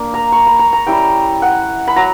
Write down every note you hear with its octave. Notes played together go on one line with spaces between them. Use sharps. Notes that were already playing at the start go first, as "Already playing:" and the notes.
Already playing: A#3 D4
A#5
C#6
B5
A#5
A#5
G3 C#4 E4 G5
F#5
B5
F#3 A#5